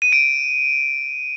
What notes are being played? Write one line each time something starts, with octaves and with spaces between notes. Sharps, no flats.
D#7
D7